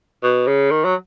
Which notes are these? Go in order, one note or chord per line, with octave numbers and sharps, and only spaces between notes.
B2
C#3
D#3
F#3